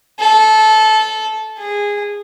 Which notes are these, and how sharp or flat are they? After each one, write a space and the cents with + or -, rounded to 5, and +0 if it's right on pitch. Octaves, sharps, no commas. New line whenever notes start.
A4 -20
G#4 -15